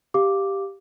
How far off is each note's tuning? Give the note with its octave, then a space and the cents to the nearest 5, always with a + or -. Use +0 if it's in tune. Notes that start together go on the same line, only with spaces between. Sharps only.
G4 +0 F5 +0 D6 +0